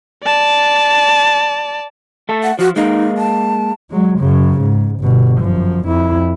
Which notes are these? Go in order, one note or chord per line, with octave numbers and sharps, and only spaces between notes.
D5 A5
A3 A4
F#5
F3 F#4
G#3 A#3 D#4
A5
F#3 G#3
F#2 C#3
G#2
G1 B2
F#2 F3
F2 E4